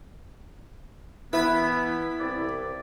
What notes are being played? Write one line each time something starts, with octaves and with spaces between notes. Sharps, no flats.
E3 B3 E4 B4 E5 B5
C2 C4 D5